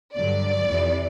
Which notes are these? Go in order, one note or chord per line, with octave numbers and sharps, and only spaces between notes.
G2 D3 F#3 D5
F2 C3 E3